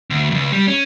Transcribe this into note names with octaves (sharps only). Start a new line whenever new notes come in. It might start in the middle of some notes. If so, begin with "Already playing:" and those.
D2
C#2 F#2
G3
C#4